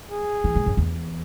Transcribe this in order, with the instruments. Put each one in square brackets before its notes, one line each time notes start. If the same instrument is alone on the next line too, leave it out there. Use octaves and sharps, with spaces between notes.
[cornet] G#4
[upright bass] E3
G#2
F#2
E2